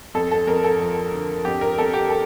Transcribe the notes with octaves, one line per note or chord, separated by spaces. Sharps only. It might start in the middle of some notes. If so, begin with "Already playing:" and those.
F2 A4
A4
F2 A#4
A4
F3
D3
F2 G4
A#4
F2 A4
G4
A4